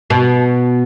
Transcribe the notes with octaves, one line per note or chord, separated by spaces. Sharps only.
B2